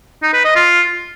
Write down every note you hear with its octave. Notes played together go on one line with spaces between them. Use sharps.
D#4
B4
D#5
F4